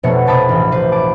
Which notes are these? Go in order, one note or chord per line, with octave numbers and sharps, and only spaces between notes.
F1 B2 A3 B3 C#5 C#7
C3 A5 B5 D6 D#6
E1 A1
B4 C5
A5 D6